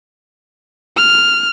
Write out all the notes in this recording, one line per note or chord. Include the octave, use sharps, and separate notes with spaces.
F6